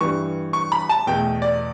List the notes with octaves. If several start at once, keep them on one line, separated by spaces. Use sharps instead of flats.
G2 E3 G3 C#6
C#6
B5
A5
E2 B2 A3 G5
D5